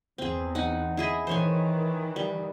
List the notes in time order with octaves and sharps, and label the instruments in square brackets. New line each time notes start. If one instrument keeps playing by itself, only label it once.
[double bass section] E2 [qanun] C4 G#4
[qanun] D#4 F#5
E4 G#4 D#5
[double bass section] D#3 E3 [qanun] C5 C#5 G#5
[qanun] G3